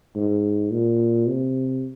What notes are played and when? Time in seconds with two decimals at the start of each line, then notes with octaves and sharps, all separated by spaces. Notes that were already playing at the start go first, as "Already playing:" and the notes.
0.15 G#2
0.71 A#2
1.27 C3